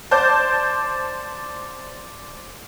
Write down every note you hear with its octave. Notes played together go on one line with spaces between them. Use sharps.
C5 D5 A5 G6